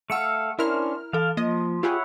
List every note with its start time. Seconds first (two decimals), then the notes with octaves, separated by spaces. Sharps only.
0.10 A3 A4 F5 F#5 E6 C#7
0.58 C#4 D4 E4 A#4 C5 F6
1.13 E3 A4 F5 A5
1.37 F3 A#3 D#5
1.83 E4 F4 G4 G#4 C#5 F#5